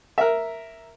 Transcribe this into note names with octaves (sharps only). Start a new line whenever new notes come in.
A#4 E5